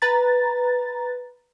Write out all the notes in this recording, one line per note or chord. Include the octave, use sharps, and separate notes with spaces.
B4 A#5 A6